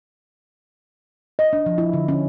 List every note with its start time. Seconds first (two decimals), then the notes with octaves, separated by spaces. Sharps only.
1.39 D#5
1.53 D4
1.66 F3
1.78 E4
1.93 D3
2.08 C#4